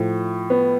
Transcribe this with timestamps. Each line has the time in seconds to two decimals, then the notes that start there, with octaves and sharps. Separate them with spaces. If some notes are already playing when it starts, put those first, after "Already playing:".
Already playing: A2 F3
0.50 B3